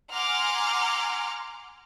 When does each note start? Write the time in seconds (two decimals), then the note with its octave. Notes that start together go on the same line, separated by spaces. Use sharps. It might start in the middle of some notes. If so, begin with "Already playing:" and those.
0.13 F#5 G#5 A#5 C6 D6 F6